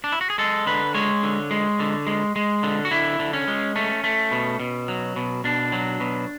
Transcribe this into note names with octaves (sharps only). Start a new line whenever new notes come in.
D4
E4
F#4
G#4
G#3 A4
D3 B4
G#3 C#5
D3
G#3
D3
G#3
G#3
D3
F#4
D3 E4
D3
C#4
G#3
A3 C#4
A3
B2
B2
F#3
B2
B2 D4
F#3
B2